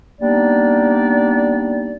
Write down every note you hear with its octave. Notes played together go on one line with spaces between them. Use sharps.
G3 A#3 B3 D4 D#4 D5